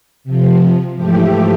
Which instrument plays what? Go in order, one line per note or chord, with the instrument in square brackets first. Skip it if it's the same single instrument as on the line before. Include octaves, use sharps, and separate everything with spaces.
[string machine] C3 F3
G#2 E3 F3 A3 G4